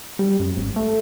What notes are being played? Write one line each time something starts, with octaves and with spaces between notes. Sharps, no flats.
G3
F#2
G#1
A3